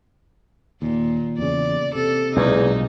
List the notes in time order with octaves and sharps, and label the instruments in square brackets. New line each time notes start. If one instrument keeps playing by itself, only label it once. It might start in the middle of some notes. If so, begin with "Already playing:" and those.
[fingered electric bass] D#2 [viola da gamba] A#2
[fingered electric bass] E2 C#3 [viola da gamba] D5
[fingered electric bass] C3 [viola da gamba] A4
[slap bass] B1 A#2 G#3 [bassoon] E2 [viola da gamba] D#4